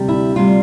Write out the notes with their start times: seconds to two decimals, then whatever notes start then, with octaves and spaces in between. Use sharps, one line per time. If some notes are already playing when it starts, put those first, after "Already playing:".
Already playing: D2 C3 G3
0.09 E4
0.36 D2 C3 G3 F4